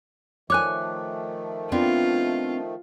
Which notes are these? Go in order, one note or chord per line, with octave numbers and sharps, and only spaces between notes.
D#3 F3 A3 C#5 G#5 D6 F#6
B3 C4 D4 F4